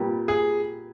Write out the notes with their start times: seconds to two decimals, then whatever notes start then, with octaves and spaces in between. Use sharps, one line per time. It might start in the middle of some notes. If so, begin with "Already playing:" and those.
Already playing: A#2 G3 B3 G4 A#4
0.28 G#4